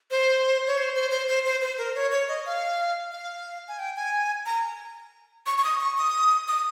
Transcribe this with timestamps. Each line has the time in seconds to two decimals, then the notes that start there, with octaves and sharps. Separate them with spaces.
0.11 C5
0.67 C#5
0.78 C5
0.95 C5
1.11 C5
1.28 C5
1.45 C5
1.61 C5
1.78 A#4
1.95 C#5
2.11 C#5
2.28 D#5
2.46 F5
3.12 F5
3.68 G#5
3.79 G5
3.96 G#5
4.46 A#5
5.46 C#6
5.58 C#6
5.64 D#6
5.81 C#6
5.98 D#6
6.48 D#6